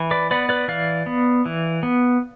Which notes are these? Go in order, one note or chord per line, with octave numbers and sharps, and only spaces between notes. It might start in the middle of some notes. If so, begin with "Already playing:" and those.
Already playing: E3
B4 D5
B3 B4 D5
B4 D5
E3 D5 F5
B3
E3
B3